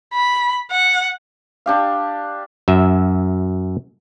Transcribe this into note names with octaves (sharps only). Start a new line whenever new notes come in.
B5
F#5
D4 G4 F5
F#2 E5